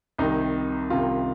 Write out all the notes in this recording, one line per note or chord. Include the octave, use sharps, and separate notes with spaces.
C2 C3 D#3 D#4
C2 C3 D#3 F4